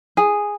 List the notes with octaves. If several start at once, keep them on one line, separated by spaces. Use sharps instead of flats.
G#4